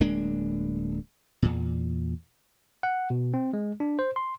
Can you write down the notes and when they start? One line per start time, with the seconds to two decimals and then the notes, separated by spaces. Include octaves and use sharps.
0.01 D1 G#3 A#3 D4
1.42 E2 A#2
2.83 F#5
3.10 B2
3.34 C4
3.53 G#3
3.80 D4
3.99 C5
4.16 C6